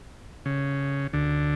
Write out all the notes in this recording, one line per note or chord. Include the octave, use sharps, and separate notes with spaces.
C#3
D2 D3